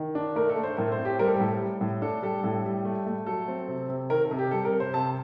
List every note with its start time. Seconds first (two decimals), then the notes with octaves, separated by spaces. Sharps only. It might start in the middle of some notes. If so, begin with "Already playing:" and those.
Already playing: D#3
0.15 D4
0.35 A3 A#4
0.49 A4
0.56 A3
0.63 C5
0.77 A2 A#4
0.92 C5
0.99 C4
1.05 G4
1.19 G3 A#4
1.26 A4
1.34 G4
1.40 A2 A4
1.61 G3
1.81 A2
2.02 D4 A4
2.22 G3 A4
2.44 A2 A4
2.65 G3
2.85 A3
3.06 A3
3.26 F#3 A4
3.48 C4
3.68 C3
3.89 C3
4.10 D#3 A#4
4.25 A4
4.31 C3
4.39 G4
4.51 G3 A4
4.65 A#4
4.72 C3
4.80 C5
4.93 C3 A5